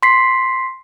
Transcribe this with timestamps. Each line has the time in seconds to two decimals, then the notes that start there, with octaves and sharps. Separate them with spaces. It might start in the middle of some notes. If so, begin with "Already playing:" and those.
0.03 C6 B6 C7